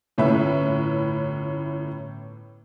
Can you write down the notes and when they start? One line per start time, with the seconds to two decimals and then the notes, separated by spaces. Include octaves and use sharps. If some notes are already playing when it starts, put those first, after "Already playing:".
0.18 G1 A2 C#4 B4 E5